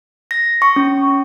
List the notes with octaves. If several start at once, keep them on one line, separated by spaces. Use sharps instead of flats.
A#6
C#6
C#4